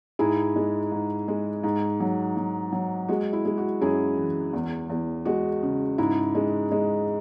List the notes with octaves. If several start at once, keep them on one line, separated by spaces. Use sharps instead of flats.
G#2 E4 G#4
G#3
G#2
G#3
G#2
F#3
F#3
F#3
G#3 F#4
E4
G#3
F#4
F#2 E4 G#4
E3
E2
E2
G#3 F#4
C#3
G#2 E4
G#3
G#3